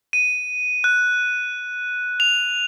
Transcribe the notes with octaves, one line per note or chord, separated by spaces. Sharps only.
D#7
F#6
F7